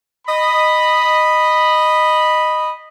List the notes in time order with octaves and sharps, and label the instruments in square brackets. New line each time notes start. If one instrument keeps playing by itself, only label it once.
[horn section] D#5 B5